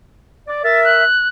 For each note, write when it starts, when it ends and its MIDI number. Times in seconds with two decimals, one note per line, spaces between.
0.47 0.63 74
0.64 1.05 70
0.64 1.05 76
0.64 0.83 93
0.85 1.28 90